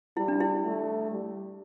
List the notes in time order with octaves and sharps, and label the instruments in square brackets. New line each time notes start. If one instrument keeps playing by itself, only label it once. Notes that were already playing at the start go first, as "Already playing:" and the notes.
[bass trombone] G3 [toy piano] E4
[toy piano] D4
E4
[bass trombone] A3
G3